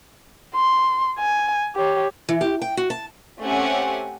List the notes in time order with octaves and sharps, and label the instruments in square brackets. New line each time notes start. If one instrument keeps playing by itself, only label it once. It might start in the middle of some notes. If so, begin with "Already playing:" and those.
[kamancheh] C6
G#5
G4 C#5
[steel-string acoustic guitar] E3
G4
G5
F#4
A5
[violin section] A3 C4 C#4 G4 F#5 G#5